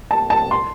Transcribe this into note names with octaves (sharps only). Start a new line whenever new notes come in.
A5
A5
C6